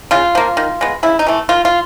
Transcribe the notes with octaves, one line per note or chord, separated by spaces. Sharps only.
C#3 F4
F3 A#3
D#3
G#3 B3
C#3 E4
D#4
E3 A3
D#3 F4
F4